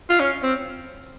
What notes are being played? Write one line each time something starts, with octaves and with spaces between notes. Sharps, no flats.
F4
C#4
C4